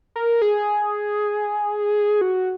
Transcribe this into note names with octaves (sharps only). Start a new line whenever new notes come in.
A#4
G#4
F#4